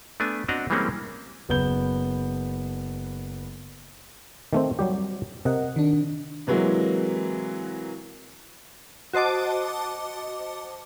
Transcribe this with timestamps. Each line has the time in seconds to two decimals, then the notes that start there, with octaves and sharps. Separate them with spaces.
0.20 A3 B3 D4 G#5
0.48 C4 D4 F#4 D#5 F#5 A#5
0.70 E3 G3 G#3 A#3 C4 C#4
1.49 F#1 B3 G6 G7
4.53 D#3 A3 C4
4.79 F#3 G3 G4
5.45 C3 A#4 D#5 F#5
5.76 D#3 D4
6.47 C3 E3 F#3 G#3 A#3 E4
9.13 F#4 C5 D#5 A5 D6